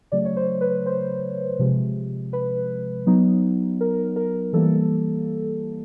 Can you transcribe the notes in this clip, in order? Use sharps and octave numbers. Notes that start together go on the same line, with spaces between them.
C#3 F#3 A3 D5
C#5
C5
B4
C5
C3 F3 G#3
B4
F#3 B3 D#4
A#4
A#4
E3 G3 A#3 A4